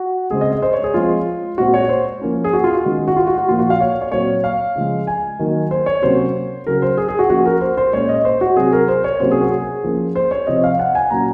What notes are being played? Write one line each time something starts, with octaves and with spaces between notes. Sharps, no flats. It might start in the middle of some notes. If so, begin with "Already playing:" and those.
Already playing: F#4
C#3 G#3 C4 G#4
D#5
D#5
C5
C#5
G#4
F3 G#3 C4 F4
A#2 G#3 C4 F#4
C#5
C5
F3 A#3 C#4
G#4
F#4
F4
F#4
D#3 G#3 C#4
F#4
F4
F#4
F#4
A#2 F3 A#3 F4
F#4
F5
C#5
C#5
A#2 F#3 C4 C#5
F5
C#3 F3 G#3
G#5
D#3 F#3 A#3
C5
C#5
C3 F#3 A#3 C#4 C5
C#3 F#3 C#4 A#4
C5
G#4
G#4
F#4
F3 A#3 C#4 F#4
A#4
C5
C5
A#2 G#3 C#4 C#5
D#5
C5
F#4
C3 F#3 C4 G#4
A#4
C5
C#5
C3 F#3 A#3 C#4 C5
G#4
F#4
G#4
F3 A#3 C#4
C5
C#5
C3 F3 C4 D#5
F5
F#5
G#5
A#2 F#3 C#4 A#5